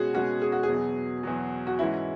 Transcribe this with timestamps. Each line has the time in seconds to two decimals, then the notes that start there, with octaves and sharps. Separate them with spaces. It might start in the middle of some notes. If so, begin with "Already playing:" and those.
Already playing: B2 G#3 C#4 F#4 G#4
0.14 B2 G#3 C#4 F#4
0.42 G#4
0.52 F#4
0.63 G#4
0.68 E2 B2 F#3
1.23 E2 B2 F#3
1.67 F#4
1.79 G#2 E3 C#4 E4 F#4